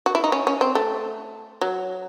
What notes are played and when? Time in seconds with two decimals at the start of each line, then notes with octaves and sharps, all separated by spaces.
0.06 F#4
0.15 E4
0.24 D#4
0.32 C#4
0.47 C#4
0.61 C4
0.75 A3
1.61 F#3